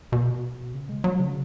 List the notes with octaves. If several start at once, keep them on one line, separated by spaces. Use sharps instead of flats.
B2
C#3
G#3
F#3
C#3